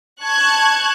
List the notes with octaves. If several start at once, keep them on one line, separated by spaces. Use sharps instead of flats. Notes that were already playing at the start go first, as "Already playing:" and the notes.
A5 C#6 F#6 G#6